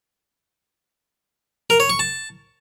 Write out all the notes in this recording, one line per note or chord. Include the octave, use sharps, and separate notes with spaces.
A#4
C#5
C#6
A5